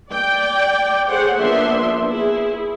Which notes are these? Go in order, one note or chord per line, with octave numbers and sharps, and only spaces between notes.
D5 G5
G#4 A4 C5 C#5 F#5
F3 A#3 B3 D4 E5 C6
E4 G#4